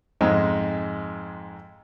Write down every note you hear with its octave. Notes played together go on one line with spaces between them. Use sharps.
F2 G#2 G#3